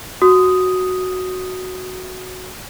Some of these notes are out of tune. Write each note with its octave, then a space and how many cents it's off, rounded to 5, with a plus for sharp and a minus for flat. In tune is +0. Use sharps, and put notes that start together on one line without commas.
F#4 +0 D#6 +0